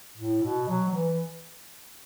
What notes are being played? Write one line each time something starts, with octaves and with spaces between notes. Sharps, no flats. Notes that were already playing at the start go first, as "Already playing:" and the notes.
A2
B2
F#3
F#3
E3